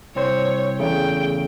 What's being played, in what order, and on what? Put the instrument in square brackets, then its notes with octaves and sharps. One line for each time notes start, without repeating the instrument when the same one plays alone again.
[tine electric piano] C2 C4 C5 [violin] C#5
[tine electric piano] E2 C#3 A3 [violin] G5